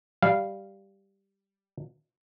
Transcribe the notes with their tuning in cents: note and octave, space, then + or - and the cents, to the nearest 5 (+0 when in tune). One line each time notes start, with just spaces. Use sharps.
G3 +0 F5 -10